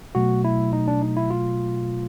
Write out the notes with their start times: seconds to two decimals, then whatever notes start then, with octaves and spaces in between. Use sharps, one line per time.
0.15 B2 F#3 A3 F#4
0.44 E4
0.73 D#4
0.88 D4
1.02 D#4
1.17 E4
1.30 F4